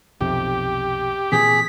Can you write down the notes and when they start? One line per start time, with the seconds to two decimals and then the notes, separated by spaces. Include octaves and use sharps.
0.21 B1 F2 C3 G4
1.32 A#2 E3 C4 G#4 B6